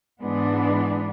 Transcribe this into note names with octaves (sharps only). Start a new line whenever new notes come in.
G#2 E3 G#3 B3 D4